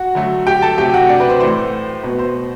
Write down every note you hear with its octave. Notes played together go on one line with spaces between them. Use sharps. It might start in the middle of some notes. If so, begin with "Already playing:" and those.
Already playing: F#4 F#5
D3 F#3 A3
G4 G5
A4 A5
C3 F#3 A3 G4 G5
F#4 F#5
D4 D5
B4
C5
A2 E3 A3 C5
B2 A3 B4
C5